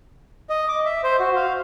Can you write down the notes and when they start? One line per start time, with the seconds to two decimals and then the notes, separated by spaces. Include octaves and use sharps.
0.50 D#5
0.68 D6
0.85 E5
1.04 C5
1.20 F#4
1.36 F5